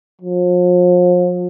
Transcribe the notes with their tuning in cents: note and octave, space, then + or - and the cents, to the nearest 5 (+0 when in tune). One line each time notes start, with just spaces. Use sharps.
F3 +40